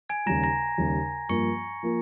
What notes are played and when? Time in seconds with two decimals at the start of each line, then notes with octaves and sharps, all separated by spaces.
0.09 G#5 G#6
0.26 D#2 C#3 G3 A#5 A#6
0.43 A#5 A#6
0.78 D#2 C#3 G3
1.29 G2 F3 A#3 C#6 C#7
1.83 F3 A#3